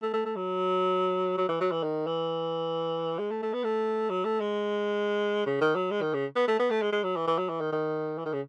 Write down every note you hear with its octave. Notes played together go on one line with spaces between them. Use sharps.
A3
A3
A3
F#3
F#3
E3
F#3
E3
D#3
E3
G#3
A3
A3
B3
A3
F#3
A3
G#3
C#3
D#3
F#3
G#3
D#3
C#3
B3
A3
B3
A3
G#3
G#3
F#3
E3
E3
F#3
E3
D#3
D#3
E3
D#3
C#3